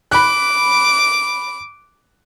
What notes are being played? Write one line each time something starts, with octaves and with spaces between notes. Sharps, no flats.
B5 D6 F#6